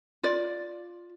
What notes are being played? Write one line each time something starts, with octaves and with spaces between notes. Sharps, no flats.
F4 D5